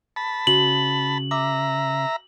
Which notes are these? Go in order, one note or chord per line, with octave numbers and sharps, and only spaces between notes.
A5 B5
C#3 F#4 F#7
E5 A#5 D6